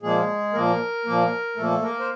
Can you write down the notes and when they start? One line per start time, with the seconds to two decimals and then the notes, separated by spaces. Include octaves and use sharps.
0.02 A#2 F3 G#3 A#3 G#4
0.53 A#2 F3 A#3 A#4
1.05 A#2 F3 A#3
1.56 A#2 F3 A3 A#3 A4
1.82 A#3 A#4
2.00 C5